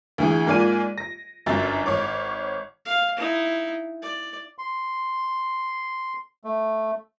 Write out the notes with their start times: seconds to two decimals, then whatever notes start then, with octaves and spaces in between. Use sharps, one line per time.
0.18 D2 E3 G#4
0.47 G#2 A#3 F4 D5 G#5 D#7
0.98 A#6
1.46 G1 F#2 A6
1.86 G#1 C#5 D6
2.85 F5
3.17 D#4 E4
4.02 D5
4.58 C6
6.44 A3